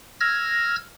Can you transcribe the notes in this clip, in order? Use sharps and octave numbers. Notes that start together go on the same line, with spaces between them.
E6 F6 G#6 A#6